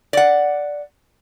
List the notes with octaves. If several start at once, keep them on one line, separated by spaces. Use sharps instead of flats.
D5 F#5